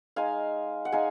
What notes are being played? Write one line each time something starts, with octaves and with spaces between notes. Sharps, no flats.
G#3 D#4 F5 G#5
F#5
G#3 D#4 F5 G#5